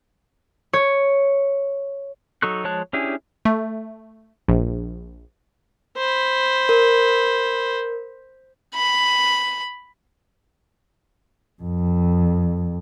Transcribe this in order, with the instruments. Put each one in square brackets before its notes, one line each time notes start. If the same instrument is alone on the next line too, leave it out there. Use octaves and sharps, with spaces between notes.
[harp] C#5
[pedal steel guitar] F#3 D#4 A4 C#6 F#6
F3 G#3 C#5 A5 F#6
C#4 D4 E4 G4 G#4
[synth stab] A3
A#1
[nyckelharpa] C5 B5
[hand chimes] A#4
[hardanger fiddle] B5
[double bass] F2